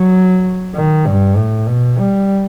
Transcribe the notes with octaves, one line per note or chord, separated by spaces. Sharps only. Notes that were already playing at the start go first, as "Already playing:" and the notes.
Already playing: F#3
D#3
G2
A2
B2
G3